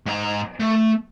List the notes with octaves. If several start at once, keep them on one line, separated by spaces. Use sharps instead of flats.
G#2 A#5
A3